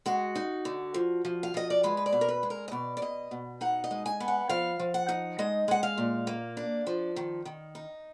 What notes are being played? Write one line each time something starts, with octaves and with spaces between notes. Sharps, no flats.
G#3 F#4
D#4
D3
F3
F3
F5
F3 D#5
D5
G#3 B4
B4
D5
B2
A#4
B4
G#3
A#4
D#5
B2 D5
D5
B2 D#5
B2
D#4 F#5
D#5
G#3
G#5
B3
F#5
F3 F5
F3
F#5
D#4
G#3 D#5
G#3 F#5
F5
A#2
A#3
D4
F3
D#3
D#3
D#4